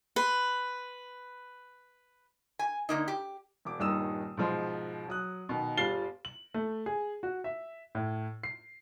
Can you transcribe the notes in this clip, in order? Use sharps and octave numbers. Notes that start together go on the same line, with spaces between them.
B4 C6
G#5
D3 A#3 D#4
G4
E1 D6
D#1 G2 D#3 D#6 E6 E7
G#2 B2 F3 D#4 C6
F#3 D#6 F#6
B2 D#3
G1 G3 F4 A6 C7 G7
F#7
A3
G#4
F#4
E5
A2
C7